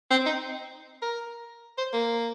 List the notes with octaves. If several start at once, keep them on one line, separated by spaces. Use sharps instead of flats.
C4
D#4
A#4
C5
A#3